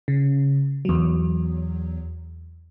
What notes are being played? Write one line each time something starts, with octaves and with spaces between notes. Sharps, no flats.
C#3
E2 F#3